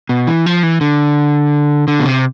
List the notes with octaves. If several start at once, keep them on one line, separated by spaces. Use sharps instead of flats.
B2
E3
F3
E3
D3
D3
B2
C3